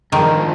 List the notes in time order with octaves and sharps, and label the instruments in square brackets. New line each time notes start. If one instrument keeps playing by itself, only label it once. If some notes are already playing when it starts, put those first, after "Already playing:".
[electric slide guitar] G2 D3 F3 G#3 [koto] D#3